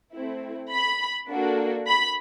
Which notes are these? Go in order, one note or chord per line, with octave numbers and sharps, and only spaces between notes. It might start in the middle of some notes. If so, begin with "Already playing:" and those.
A3 C4 E4
B5
A#3 D4 F#4 A4
B5